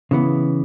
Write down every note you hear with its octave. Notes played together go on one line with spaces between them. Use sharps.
C#3 E3 B3